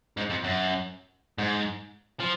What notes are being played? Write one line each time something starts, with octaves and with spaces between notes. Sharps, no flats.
G#2
F2
F#2
G#2
F3